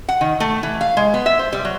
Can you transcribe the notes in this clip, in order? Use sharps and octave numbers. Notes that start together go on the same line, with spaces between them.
F#5
D#3
A3
E3
F5
G#3
B3
E5
C5
G3
F#3